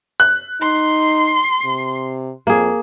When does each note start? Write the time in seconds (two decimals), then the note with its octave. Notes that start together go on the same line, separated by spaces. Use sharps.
0.20 F#6
0.62 D#4 C6
1.65 C3
2.47 F2 A#3 G#4